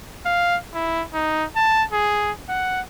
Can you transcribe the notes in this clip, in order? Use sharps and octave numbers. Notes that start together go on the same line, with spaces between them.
F5
E4
D#4
A5
G#4
F#5